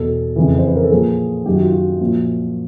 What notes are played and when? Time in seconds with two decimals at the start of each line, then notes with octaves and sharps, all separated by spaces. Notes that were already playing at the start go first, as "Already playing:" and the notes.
Already playing: E2 B2 A4
0.36 F2 C#3 E3
0.59 C5
0.67 B4
0.75 A#4
0.83 A4
0.91 A#2 F3 G#4
1.45 F#2 D#3 G4
1.55 F#4
1.63 F4
1.72 F#4
2.01 A#2 F3